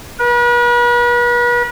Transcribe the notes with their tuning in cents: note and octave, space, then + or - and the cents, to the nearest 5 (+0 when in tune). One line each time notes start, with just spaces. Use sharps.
B4 -40